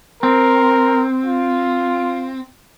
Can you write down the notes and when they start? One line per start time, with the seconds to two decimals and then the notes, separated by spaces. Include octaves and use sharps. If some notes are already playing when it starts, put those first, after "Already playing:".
0.23 C4 A#4
1.25 F4